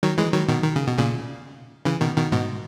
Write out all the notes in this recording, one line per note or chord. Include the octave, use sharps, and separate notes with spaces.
D#3 F#3
E3 G#3
D#3 F#3
B2 D#3
D#3
C#3
B2
A#2 C#3
C#3 E3
B2 D#3
B2 D#3
G#2 B2